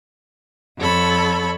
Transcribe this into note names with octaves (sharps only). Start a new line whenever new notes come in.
F2 A4 C#5 B5